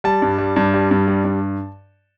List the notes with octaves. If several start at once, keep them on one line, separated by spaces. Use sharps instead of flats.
G3 A5
G2
G3
G2
G3
G2
G3
G2